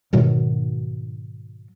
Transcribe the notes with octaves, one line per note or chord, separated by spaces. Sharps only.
G#2 B2 D#3 F#3